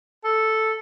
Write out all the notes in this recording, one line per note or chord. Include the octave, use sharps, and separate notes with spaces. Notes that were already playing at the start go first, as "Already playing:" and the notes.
A4